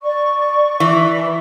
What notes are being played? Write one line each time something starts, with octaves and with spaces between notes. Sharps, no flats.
D5 C#6
E3